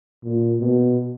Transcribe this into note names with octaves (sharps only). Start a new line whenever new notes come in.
A#2
B2